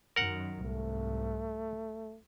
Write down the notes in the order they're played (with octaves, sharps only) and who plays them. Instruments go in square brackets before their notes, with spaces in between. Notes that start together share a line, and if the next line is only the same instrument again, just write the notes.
[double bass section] F#2 D#3 [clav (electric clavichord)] A#4 F#5
[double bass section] C2 G#2 [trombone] A3